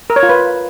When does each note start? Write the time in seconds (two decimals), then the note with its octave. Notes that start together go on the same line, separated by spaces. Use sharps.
0.10 A#4
0.16 C#5
0.23 F4
0.29 B4